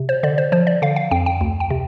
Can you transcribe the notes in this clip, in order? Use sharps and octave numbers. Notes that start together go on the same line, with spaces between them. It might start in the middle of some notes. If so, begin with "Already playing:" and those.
Already playing: C3
C5
D3 D5
C5
F3 C5
D5
D3 F5
F5
F2 G5
G5
D2
G5
C3